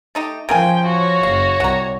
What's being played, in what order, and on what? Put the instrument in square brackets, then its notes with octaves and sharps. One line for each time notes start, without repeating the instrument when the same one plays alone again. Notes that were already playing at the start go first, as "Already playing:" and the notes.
[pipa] A3 D#4 G4
[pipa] C#3 A#4 G#5 [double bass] F3 [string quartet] G5
[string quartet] F#4 C#5
[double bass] F#1 [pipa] F5
[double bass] C2 [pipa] F#5 A#5